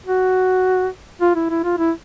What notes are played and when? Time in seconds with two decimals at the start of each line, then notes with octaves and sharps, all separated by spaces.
0.06 F#4
1.21 F4
1.35 E4
1.50 E4
1.64 F4
1.78 E4